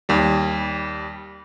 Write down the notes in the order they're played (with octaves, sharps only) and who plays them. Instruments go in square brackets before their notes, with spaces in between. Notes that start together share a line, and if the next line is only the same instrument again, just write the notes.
[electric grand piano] D#2 G3